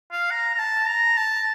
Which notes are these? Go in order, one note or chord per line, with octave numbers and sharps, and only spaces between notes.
F5
A#5
A#5
A5
A#5
A5